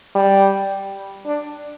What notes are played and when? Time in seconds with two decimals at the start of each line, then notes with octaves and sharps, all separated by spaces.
0.16 G3
1.26 D4